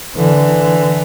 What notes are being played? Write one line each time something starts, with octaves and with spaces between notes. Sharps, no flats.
D3 E3